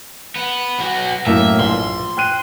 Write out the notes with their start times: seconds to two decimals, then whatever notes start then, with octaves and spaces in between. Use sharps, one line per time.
0.36 B3
0.79 B1 F#4
1.26 F#2 A2 A#3 E5
1.60 A#1 C6
2.17 G5 F#6 D#7